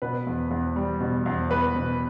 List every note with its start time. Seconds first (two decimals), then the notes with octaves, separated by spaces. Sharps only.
0.02 B2 B4
0.27 E2
0.51 E2
0.76 G3
1.01 B2
1.26 E2
1.50 E2 B4
1.75 B2